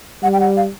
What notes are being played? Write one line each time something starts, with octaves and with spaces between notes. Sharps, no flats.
G3 F#5
G5
F#5
F5